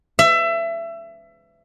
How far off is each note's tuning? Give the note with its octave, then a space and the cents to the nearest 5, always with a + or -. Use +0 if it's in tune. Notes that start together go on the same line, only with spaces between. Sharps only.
E5 +25